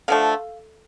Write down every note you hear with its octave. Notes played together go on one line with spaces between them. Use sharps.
D3 F3 A3 F5